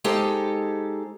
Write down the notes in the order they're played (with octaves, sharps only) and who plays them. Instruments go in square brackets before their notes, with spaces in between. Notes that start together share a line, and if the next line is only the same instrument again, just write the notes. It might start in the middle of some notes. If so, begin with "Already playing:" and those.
[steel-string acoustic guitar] G#3 D#4 G4 A4 C5